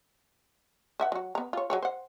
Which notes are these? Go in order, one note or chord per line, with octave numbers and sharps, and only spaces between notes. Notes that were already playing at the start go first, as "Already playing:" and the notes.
B4 E5 F#5
F#3 F#4
B3 A#5
F4 C#5
F#3 G#4 C#5
C5 F#5